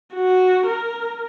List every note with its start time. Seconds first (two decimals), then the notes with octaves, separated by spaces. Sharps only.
0.14 F#4
0.67 A#4